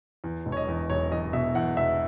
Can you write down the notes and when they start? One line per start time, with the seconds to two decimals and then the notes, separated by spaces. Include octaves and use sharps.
0.24 E2
0.46 E1
0.52 C#5
0.57 D#5
0.68 E2
0.90 E1 C#5
1.12 E2 D#5
1.33 B2 E5
1.55 E2 F#5
1.77 E1 E5